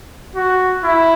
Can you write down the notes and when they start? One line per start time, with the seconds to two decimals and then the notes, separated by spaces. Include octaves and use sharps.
0.35 F#4
0.84 E4